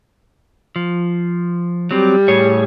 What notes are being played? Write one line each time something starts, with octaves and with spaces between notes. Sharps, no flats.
F3
F#3 G3 C4
A2 G#4 C#5